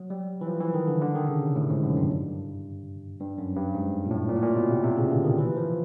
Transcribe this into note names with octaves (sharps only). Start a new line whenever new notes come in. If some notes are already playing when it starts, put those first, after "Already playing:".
Already playing: F#3
G3
E3
F3
E3
D#3
D3
D3
D#3
C#3
C3
A2
G#2
F#2
G2
G2
F#2
G2
G#2
A#2
A2
A#2
A2
A#2
B2
C3
C3
C#3
D3
D#3
E3
F3